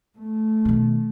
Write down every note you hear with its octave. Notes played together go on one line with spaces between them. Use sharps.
A3
B2 D#3